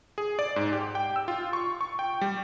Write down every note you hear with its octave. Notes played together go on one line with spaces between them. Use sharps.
G#4
D5
G#2
G4
G5
E6
F4
C#6
C#6
G5
G3